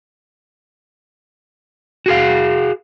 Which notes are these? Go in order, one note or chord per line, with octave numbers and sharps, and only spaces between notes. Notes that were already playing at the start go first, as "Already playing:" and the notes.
F#4 G#4 F5